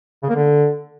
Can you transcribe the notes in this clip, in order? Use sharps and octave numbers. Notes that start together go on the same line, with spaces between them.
C#3
A#3
D3